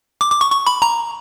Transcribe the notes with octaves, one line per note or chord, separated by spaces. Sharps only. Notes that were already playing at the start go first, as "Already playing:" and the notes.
D6
D6
C#6
C#6
B5
A#5